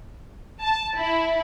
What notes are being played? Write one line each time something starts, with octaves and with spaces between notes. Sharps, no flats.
A5
E4